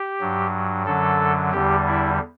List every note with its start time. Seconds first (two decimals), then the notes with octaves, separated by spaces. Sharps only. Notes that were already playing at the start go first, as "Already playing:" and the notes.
Already playing: G4
0.21 G2 F#3
0.86 F#2 D3 F#3 A4
1.53 E2 D3 G3 G4
1.87 E4